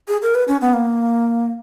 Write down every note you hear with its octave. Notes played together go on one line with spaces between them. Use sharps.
G#4
A#4
B4
C#4
B3
A#3